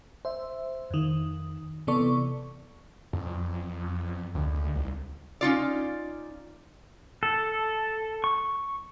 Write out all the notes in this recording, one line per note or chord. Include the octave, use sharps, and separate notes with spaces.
C5 E5
F2 D#3
C3 E3 B3 A4 D5 C#6
F2
D2
C2
C#4 D#4 F4 D5
A4
C#6